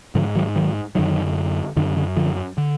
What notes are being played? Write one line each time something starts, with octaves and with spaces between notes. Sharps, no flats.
G#2 D3 F3
D#3 F#3
D#3 F#3
F#2 D3 D#3 F#3
F#2 D3 D#3
D3
D3 F3
D3